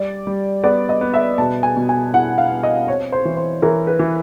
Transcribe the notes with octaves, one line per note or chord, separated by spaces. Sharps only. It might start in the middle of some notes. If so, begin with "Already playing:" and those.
Already playing: G3 D5
G3
B3 D5
D#5
B3
E5
B2 A5
G#5
B2
G#5
E4 F#5
F5
B3
D#5
C4 C#5
C5
E3
C5
E3 A#4
B4
E3